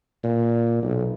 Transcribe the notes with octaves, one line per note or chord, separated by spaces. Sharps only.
A#2
B1